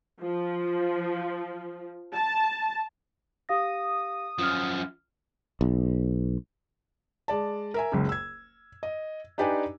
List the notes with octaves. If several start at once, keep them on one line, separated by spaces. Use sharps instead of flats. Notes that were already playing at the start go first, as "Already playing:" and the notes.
F3
A5
G4 F5 D#6 A#6
F#2 F3 F4 F6
B1
G#3 D5 A5
A#4 E5 G#5
F#1 C#2 C#3
E6 G#6
D#5
D4 D#4 G4 B4 D5 G#5